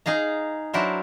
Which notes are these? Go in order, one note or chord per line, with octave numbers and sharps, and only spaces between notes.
D#4 G#4 F5 A#5
F#3 D4 E4 A#4 C5